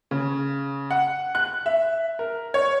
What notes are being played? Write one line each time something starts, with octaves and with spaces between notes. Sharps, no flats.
C#3
F#5
F#6
E5
A#4
C#5